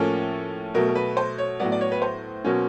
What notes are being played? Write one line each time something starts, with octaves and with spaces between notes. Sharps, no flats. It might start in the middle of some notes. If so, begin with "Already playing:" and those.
Already playing: A2 F3 A#3 C#4 A4
B2 F#3 A3 A#4
A#4
B4
C5
C#5
A2 F#3 B3 D5
D5
C#5
B4
C5
B2 F#3 A#3 C#4